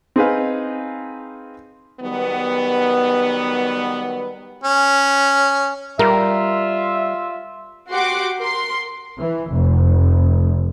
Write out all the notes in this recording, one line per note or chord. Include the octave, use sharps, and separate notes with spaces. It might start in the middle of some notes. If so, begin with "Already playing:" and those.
C4 D#4 G#4 B4 F5
D#3 F#3 G3 B3
C#4
G3 F4 A#4 E5
F#4 G4 F#5 C6 D6
A#4 C6
E3
F1